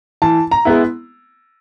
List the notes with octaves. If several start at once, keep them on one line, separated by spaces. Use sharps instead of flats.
E3 A5
A#5
G#3 B3 E4